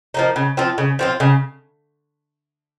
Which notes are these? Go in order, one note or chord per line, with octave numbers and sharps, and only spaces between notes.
F3 A#3 D#4
C#3
F3 C4 F4
C#3
F3 C4 F4
C#3